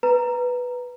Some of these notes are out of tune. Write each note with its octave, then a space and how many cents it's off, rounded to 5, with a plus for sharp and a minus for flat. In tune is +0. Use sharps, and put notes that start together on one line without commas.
B4 +0 A#5 +0